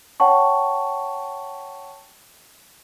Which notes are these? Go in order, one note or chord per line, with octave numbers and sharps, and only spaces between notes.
C#5 F#5 G5 A5 C#6